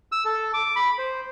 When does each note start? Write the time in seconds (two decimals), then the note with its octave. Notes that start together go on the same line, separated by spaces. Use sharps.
0.12 E6
0.25 A4
0.54 D6
0.76 B5
0.98 C5